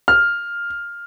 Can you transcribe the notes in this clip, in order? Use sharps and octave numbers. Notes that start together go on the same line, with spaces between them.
F6